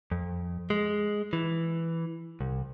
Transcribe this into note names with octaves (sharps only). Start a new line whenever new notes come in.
F2
G#3
E3
C2